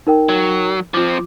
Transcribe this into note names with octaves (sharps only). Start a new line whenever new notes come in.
D#4 A#4 G5
F#3
F3 C4 F4 D6